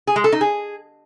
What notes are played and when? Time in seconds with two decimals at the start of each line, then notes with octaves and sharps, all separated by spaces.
0.07 G#4
0.16 G#3
0.24 A4
0.32 D#4
0.41 G#4